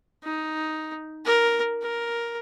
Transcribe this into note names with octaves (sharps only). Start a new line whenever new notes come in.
D#4
A#4
A#4